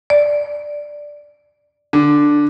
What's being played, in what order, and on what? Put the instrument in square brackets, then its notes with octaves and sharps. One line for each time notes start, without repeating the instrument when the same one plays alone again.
[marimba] D5
[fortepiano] D3